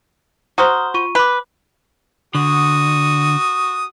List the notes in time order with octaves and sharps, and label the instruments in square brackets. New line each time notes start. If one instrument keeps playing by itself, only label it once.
[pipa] F#4 C5 [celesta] A#5 D#6 F6
[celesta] F4 C#6 D#7
[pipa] B4 [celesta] B5 D6
[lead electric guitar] D3 [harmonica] F#4 D#6